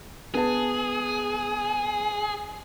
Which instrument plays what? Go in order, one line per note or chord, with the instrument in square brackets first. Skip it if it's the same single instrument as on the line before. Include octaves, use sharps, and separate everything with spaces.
[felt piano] B3 A5 [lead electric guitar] G#4